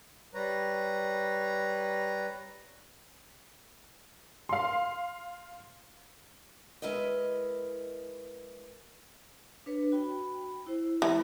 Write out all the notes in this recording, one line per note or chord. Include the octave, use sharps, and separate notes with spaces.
G3 B4 C#5 A#5
F5 C6
G#3 E4 A#4 B4 D#5
D4 B4 C#5
F#4 G5 B5
E4 C5
E3 G#3